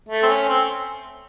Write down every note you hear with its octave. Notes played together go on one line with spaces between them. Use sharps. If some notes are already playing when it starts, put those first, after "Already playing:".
A3
C4
C#4
C4